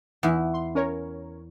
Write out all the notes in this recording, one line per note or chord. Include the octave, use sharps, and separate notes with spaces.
E2 E4
C6
C#4 A#4 C#5